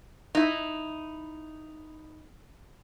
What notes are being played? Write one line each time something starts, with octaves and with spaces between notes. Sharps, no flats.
D#4 E4